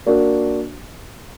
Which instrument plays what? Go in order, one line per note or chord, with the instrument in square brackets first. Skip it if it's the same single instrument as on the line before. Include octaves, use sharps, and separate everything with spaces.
[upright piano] A#3 D4 F#4 A#4